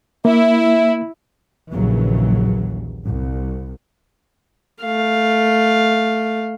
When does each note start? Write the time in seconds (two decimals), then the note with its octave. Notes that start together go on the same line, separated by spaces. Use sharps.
0.25 A#3 E4 E5
1.71 A#1 D#2 C#3 E3 F#3
3.05 C2
4.82 A3 F5